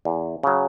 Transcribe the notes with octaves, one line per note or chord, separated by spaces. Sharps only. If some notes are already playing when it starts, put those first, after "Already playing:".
E2
C#3 F#3